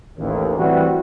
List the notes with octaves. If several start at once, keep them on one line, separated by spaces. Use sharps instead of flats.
A1 D#2
A2 E3 G3 C4 E4 F#4